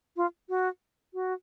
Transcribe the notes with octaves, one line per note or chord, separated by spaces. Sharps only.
F4
F#4
F#4